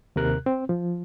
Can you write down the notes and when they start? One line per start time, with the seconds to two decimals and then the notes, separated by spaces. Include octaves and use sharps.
0.16 D#2 C3 A#4 F#6
0.46 C4
0.69 F3